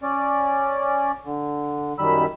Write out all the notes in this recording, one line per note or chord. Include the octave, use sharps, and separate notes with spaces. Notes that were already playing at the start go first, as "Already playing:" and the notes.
C#4 D5
D3
F#2 D#3 G3 B5 E6